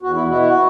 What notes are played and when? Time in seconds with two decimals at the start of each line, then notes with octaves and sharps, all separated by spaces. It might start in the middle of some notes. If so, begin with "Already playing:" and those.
0.02 E2 F#4
0.16 E4
0.28 B2 B3 E4 F#4
0.42 F#4